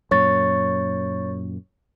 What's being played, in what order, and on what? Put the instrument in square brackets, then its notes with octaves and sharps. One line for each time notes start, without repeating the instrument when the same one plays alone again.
[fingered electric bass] F#2 A#2 [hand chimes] C#5 C#6 A6